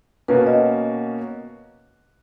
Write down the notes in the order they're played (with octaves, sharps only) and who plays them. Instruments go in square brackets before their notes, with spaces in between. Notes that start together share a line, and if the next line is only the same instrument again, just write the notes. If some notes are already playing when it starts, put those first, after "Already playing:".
[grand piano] B2 A#3 C#4 F#4 [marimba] B4
[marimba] D#5